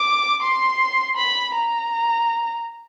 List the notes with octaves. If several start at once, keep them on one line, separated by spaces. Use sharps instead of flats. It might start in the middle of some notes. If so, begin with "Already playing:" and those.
Already playing: D6
C6
B5
A#5